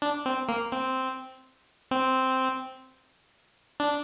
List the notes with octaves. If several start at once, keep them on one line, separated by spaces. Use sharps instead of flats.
D4
C4
A#3
C4
C4
D4